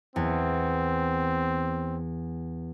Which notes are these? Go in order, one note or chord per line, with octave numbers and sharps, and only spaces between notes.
E2 C4